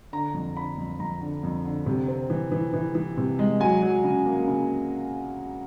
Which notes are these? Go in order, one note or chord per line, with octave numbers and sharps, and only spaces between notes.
D3 A#5
F2
D3 B5
F2
F2 A#5
D3
F2
D3
C3
C4
E3
E3
E3
E3
C3
G#3
F#3 G#5
F#3
C#3
A#3
C#3